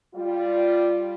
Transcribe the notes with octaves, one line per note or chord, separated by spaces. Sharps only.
G3 F4